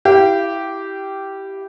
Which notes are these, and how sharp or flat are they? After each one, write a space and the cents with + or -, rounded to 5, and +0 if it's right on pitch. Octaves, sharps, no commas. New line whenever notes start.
E4 +0 G4 -10 F5 -40